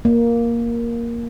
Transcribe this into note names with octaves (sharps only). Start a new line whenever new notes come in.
A#3